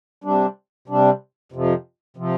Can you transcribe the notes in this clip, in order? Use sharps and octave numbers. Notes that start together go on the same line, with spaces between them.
C3 G3 D4
C3 G3 D4
F2 C3 F3
C3 F3